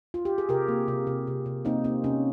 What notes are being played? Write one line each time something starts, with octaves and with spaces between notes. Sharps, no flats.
F4
G4
G#4
C3 G4 A#4
A#3
C3
C3
C3
C3
A#3 C4 D#4
A#3 C4
C3 C#4